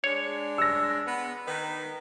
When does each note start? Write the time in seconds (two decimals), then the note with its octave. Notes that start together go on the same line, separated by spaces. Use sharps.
0.04 G#3 D4 C#5
0.58 E6 A#6
1.06 B3
1.46 D#3 D#4 B4